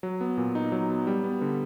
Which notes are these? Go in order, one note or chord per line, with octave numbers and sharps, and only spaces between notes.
F#3
B3
A#2
D#4
F#3
B3
G3
B3
D3